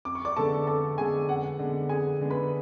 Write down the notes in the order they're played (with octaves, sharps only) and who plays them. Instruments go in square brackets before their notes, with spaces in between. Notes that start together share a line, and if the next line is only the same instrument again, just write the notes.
[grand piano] F2 [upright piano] D6
[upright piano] C#6
D5 D6
[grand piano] D3 G#3 B3 [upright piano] A4 A5
[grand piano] F2 [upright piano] A4 A5
[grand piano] D3 G#3 B3 [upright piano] G#4 G#5
[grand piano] F2 [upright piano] F#5
[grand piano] D3 G#3 B3
[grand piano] F2 [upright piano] G#4 G#5
[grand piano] D3 G#3 B3
[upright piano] B4 B5